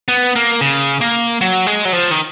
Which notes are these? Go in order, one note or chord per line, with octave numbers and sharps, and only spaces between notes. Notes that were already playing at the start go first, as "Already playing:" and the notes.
B3
A#3
C#3
A#3
F#3
G#3
F#3
F3
D#3